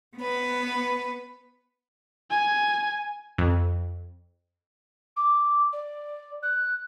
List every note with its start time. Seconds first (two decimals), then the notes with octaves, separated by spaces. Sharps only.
0.18 B3 B4
2.30 G#5
3.38 F2
5.16 D6
5.72 D5
6.42 F#6